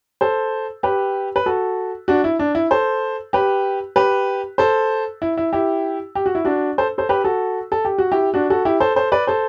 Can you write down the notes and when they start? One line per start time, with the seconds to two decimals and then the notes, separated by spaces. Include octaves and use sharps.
0.21 A4 C5
0.83 G4 B4
1.36 B4
1.46 F#4 A4
2.08 D4 F#4
2.24 E4
2.39 D4
2.55 E4
2.71 A4 C5
3.33 G4 B4
3.96 G4 B4
4.58 A4 C5
5.22 E4
5.37 E4
5.53 E4 G4
6.15 G4
6.26 F#4
6.35 E4
6.45 D4 F#4
6.78 A4 C5
6.98 A4 C5
7.09 G4 B4
7.24 F#4 A4
7.72 A4
7.85 G4
7.98 F#4
8.12 E4 G4
8.34 D4 F#4
8.50 F#4 A4
8.65 E4 G4
8.80 A4 C5
8.96 A4 C5
9.12 B4 D5
9.27 A4 C5